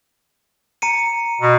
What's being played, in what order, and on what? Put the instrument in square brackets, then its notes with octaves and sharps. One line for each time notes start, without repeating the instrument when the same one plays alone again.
[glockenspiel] A#5 C#7 D#7
[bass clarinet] B2